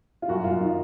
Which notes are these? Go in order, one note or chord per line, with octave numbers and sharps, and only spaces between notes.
F4
F#2 F#4
F#2 F4
D#3 D#4